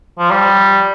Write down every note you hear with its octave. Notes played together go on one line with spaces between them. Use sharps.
F3
G3